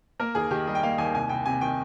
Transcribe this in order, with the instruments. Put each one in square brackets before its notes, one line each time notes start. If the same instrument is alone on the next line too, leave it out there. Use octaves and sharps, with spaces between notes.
[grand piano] A#3 A#4
D#2 G#4
D#3 G4
G3 D#5
G5
A#3 F5
D#2 G#5
C2 G#5
C2 G5
C3 G#5
D#3 G5